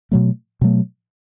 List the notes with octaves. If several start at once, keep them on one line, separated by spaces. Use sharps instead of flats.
B2 F#3 A3
B2 F#3 A3